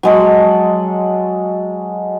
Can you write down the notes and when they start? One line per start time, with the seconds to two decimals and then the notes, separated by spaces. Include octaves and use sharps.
0.03 F#3 G#3 A4